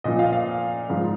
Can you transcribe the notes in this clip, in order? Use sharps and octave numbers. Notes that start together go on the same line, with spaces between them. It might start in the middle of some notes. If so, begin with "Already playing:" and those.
A#2 F3 D#5
F5
F5
G#2 F3